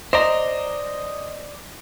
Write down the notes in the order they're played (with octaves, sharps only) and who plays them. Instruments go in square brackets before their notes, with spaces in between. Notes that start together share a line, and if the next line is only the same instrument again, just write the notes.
[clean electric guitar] C5 D5 A#5 [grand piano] D#5